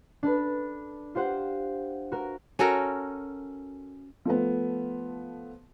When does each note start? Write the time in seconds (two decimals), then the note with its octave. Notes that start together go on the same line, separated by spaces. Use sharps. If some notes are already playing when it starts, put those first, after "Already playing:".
0.23 D4 A4 B4
1.15 F4 G4 C5 F#5
2.12 F#4 A#4
2.59 C#4 F#4 A4 A#4
4.25 F3 A3 B3